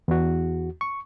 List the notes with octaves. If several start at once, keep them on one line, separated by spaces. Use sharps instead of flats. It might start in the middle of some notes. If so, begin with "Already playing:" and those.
E2 F#4
C#6